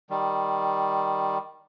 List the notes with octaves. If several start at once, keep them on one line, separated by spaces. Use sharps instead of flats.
D#3 G3